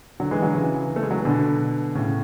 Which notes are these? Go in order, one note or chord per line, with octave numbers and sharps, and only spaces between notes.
D3 F#3
E3 G#3
D3 F#3
C#3 E3
A3
G#3
F#3
E3
B2 D3
A2 C#3